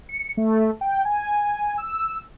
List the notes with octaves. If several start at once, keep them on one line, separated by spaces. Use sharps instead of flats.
C#7
A3
G5
G#5
E6